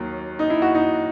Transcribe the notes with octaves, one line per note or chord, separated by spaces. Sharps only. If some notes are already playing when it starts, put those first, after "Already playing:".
Already playing: D#2 D#3 F#3
D#4
E4
F#4
D#4